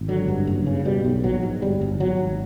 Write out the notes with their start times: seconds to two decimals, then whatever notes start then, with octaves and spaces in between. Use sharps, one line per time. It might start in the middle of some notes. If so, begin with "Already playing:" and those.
Already playing: G#1
0.08 D3 F#3
0.28 G2
0.47 F#1
0.66 C#3
0.85 B2 G3
1.05 B1
1.24 A#1 F#3
1.43 G#2
1.62 G1 G3
1.81 G1
2.00 G#1 F#3
2.19 G#1